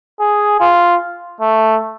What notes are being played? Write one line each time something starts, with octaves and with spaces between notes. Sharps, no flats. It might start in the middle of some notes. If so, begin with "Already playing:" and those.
G#4
F4
A3